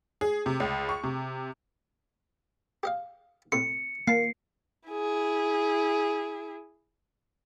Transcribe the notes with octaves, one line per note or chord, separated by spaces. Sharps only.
G#4
C3
C#2
C#6
C3
G4 D#5 F5
A2 C3 C6 C#7
A#3 F5 A5 C7
E4 G#4